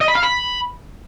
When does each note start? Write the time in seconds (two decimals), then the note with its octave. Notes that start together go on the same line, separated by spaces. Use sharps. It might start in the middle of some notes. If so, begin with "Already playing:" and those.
0.01 D#5
0.08 B5
0.15 F5
0.23 B5